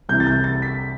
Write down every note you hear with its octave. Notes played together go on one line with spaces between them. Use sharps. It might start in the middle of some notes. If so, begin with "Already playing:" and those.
C2 C3 E3 G6
A6
G6
A6
B6